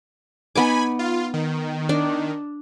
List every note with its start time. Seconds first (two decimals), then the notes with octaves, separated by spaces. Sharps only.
0.55 B3 D#4 G#5 B5 D6
0.99 F4
1.34 D#3
1.89 D4